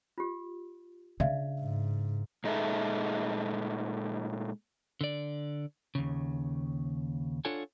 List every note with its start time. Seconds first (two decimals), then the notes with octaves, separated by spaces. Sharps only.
0.18 F4 G4
1.20 C#3 D4 D5 E5 F5
1.60 G#2
2.44 A#2 G#3 D#4 A4 E5
5.01 D3 D5
5.95 D#2 C#3
7.45 D4 F4 A4 C#5 F#5 G#5